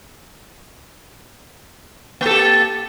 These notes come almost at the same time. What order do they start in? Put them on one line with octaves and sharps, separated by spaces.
A#3 A4 G4